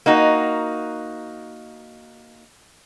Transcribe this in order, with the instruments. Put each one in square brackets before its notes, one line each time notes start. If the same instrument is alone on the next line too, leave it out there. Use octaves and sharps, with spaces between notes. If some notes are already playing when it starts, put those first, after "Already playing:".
[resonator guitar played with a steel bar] A#3 D#4 F#4